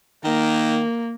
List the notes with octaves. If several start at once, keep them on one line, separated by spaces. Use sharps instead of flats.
D#3 A#3